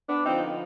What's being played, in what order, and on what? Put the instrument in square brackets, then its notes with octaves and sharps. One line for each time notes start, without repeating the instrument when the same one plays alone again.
[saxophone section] B3 D4
D3 F3 B3 C4 D#4